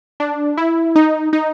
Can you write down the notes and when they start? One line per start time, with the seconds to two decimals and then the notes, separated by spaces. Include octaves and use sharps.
0.20 D4
0.57 E4
0.96 D#4
1.33 D#4